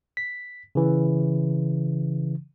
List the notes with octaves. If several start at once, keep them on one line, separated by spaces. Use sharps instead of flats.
B6
C#3 E3